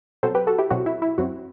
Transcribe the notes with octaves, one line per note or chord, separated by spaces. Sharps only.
B2 F#3 C4 A4 C5
G4 B4
F#4 A4
E4 G4
B2 F#3 C4 F#4
E4
E4
F#2 F#3 C4 F#4